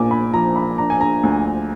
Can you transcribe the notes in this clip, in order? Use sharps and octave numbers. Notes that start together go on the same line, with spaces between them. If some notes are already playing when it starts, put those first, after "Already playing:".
Already playing: A#1 A#2 G#5 D6
B5
F3 A#5
B5
D4 A#5
G#5
A#5
D2